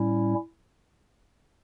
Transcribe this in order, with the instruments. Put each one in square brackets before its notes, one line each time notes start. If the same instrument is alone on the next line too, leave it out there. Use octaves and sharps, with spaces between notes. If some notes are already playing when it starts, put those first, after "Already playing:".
Already playing: [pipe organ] A2 G3 C#4 E4